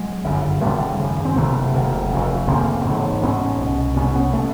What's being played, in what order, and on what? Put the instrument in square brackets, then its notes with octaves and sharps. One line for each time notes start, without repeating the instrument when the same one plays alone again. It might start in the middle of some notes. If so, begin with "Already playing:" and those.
Already playing: [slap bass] F#3 G#3
G1 F#2 C#3
G#1 F#2 C#3 G3 A3
G#1 F#2 C#3
C4
F#1 E2 C3 A3 B3
F#1 E2 C3
F1 F2 C#3
F1 F2 C#3 A#3 C4
A1 G#2
A1 G#2 B3 C#4
C2 B2
C2 B2 B3 C#4
B3 C#4
B2 A3 B3